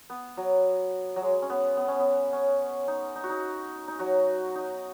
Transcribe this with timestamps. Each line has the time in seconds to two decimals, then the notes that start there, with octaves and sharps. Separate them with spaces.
0.10 B3
0.37 F#3
1.16 F#3
1.22 G#3
1.42 C#4
1.50 B3
1.77 B3
1.88 C#4
2.00 B3
2.33 C#4
2.88 D#4
3.16 D#4
3.24 F#4
3.30 D#4
3.88 D#4
3.99 F#3 F#4
4.55 D#4